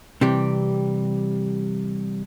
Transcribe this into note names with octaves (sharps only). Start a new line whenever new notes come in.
C3 E3 G3 G4